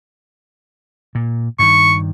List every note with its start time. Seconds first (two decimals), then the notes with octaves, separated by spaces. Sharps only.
1.15 A#2
1.59 G2 D#3 C#6